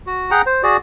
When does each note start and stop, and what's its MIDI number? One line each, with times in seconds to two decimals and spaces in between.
0.07 0.31 66
0.31 0.42 68
0.31 0.42 78
0.31 0.42 79
0.31 0.42 82
0.46 0.62 72
0.63 0.77 66
0.63 0.77 68
0.63 0.77 74